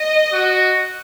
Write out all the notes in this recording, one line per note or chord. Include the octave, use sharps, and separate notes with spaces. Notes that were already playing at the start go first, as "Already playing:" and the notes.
Already playing: D#5
F#4